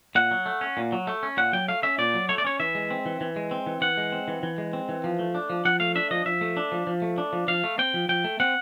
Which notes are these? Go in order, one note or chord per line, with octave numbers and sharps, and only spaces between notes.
A#2 F#5
F#3
A3
C#4
A#2
F#3
A3
C#4
A#2 F#5
F#3 G5
A3 F5
C#4 E5
A#2 D5
F#3
A3 C#5
D5
C#4 C#5
E3 E5
G#3
C4
E3
E3
G#3
C4
E3
E3 F#5
G#3
C4
E3
E3
G#3
C4
E3
F3
A3
D4
F3
F3 F#5
A3 F5
D4 E5
F3 D#5
F3 E5
A3
D4
F3
F3
A3
D4
F3
F3 F5
A3
C4 G5
F3
F3 G5
A3
C4 F#5